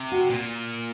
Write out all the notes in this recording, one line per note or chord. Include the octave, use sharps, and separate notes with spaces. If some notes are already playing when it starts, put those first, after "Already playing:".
Already playing: C3
F#4
A#2